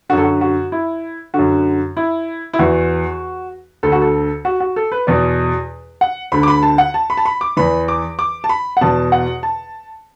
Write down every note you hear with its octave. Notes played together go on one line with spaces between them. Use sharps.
F#2 D3 F#4 A4
F#4
F#4
E4
D3 F#4
F#2
E4
E4
E2 E3 F#4
D2 D3 A4
F#4
A4
F#4
F#4
A4
B4
E2 B2 D5
F#5
D2 D3 B5
D6
B5
A5
F#5
A5
B5
A5
B5
D6
E2 E3 B5
D6
D6
A5
B5
F#5
E2 B2 A5
F#5
A5